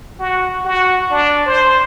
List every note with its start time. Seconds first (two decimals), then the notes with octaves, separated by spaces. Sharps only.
0.19 F#4
0.65 F#4
1.11 D4
1.46 C5